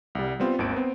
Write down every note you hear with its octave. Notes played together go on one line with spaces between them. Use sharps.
C2 G3
G3 B3 C4 F4
G#1 D#2 C4 D7
B3 C4